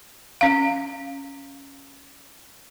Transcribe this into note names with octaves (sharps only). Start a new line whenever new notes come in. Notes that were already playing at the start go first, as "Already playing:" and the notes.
C#4 F5